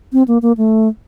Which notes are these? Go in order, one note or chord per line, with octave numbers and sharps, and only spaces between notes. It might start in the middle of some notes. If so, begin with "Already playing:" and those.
C4
A#3
A#3
A3